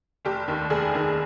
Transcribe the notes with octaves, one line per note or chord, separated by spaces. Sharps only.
F1 G4
D#2 D#3
F1 G#4
D#2 D#3